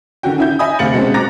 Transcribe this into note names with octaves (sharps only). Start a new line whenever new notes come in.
D3 D#3 C#4 F#4 G5
C#4 E4 G6
D#5 E5 G#5 B5 D#6
D2 C3 F5 A6 C#7 F#7
B2 G#3 C4 C#4
A#5 D6 F#6 A6 A#6